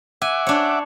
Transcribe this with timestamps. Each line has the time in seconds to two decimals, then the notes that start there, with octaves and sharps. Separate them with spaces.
0.22 E5 F#5 G#5 D6
0.47 D4 C#5